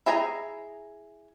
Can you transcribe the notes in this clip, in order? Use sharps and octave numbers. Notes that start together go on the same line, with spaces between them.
E4 G#4 D#5 G5 A#5